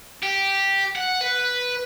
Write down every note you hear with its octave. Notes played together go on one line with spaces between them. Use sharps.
G4
F#5
B4